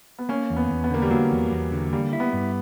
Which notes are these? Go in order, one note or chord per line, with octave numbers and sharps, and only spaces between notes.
B3
A#3 C#4
E2
B3
E2
B3
D3 A#3
G3
F#3 A#3
E2
E2
D3
G3 A#3
E4
B3
G2